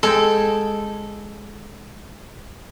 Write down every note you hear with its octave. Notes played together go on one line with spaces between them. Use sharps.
G#3 G#4 A4 G5